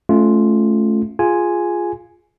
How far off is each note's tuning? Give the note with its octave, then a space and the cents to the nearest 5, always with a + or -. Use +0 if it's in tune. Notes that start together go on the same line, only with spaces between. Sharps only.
A3 -20 C#4 +0 F4 +0
F4 +0 G#4 +0 G#5 +0